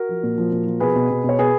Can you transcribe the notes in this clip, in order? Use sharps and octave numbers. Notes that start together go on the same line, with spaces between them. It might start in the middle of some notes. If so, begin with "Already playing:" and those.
Already playing: F#4 A#4
F3
A#2
F3
A#2
F3
B2 G#4 B4
B2
B2
B2 C#5
B2 G#4 B4